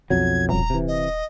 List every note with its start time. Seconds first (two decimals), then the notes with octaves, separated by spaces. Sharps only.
0.10 B1 F2 F#3 G#6
0.49 D#1 A#5
0.70 C3 E3
0.87 D#5